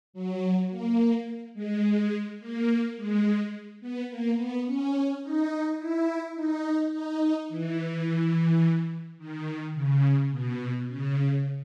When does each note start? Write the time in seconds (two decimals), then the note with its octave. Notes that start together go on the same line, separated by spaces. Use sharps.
0.14 F#3
0.70 A#3
1.54 G#3
2.39 A#3
2.97 G#3
3.81 B3
4.09 A#3
4.37 B3
4.66 C#4
5.23 D#4
5.79 E4
6.36 D#4
6.93 D#4
7.49 E3
9.18 D#3
9.74 C#3
10.31 B2
10.88 C#3